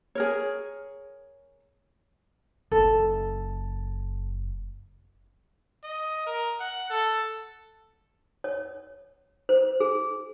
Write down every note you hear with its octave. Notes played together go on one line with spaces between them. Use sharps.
G#4 A#4 C#5
F#1 A4
D#5
A#4
F#5
A4
C#5
C5
G#4